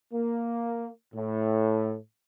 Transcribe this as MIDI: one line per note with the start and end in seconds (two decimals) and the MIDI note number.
0.11 0.88 58
1.13 1.95 45